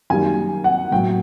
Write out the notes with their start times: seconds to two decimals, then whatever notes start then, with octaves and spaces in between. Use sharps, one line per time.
0.10 F#2 D#3 G3 A#3 G#5
0.64 F#5
0.91 A2 F#3 A#3 G5